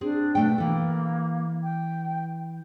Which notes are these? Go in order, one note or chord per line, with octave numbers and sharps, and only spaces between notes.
C4 D4 G#4
B2 A3 G5
E3 A#3 A4
G5